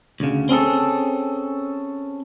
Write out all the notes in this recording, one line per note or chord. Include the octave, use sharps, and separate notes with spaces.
D2 C#3
C4 C#4 G#4 A4